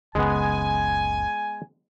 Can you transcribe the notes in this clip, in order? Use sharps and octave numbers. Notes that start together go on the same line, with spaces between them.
F#1 C#2 C#3 G#3 B3 G#5